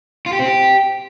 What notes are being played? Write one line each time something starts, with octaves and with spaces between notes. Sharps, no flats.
F4
G4
C4
G4